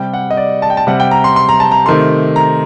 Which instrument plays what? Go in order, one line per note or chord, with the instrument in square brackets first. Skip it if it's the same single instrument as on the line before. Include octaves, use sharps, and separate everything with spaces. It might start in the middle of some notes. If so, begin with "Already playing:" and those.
Already playing: [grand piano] C3 G3 G5
F#5
D#5
D5
A5
G5
A5
C3 G3 F#5
G5
A#5
C6
C6
A#5
A5
A#5
C3 D#3 A3 C6
A#5